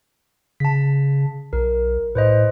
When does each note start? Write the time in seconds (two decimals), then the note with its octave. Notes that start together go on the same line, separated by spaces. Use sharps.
0.60 C#3 A5 B6
1.53 B1 A#4
2.15 A2 B4 C5 D#5